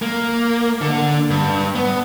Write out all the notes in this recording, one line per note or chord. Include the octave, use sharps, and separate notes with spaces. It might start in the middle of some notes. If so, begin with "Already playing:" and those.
A#3
D3
G2
B3